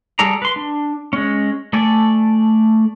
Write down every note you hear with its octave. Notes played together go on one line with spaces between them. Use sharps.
G3 G#4 A4 D5 A#5
B4 C6
D4
G#3 C#4
A3 A4 D5 G#5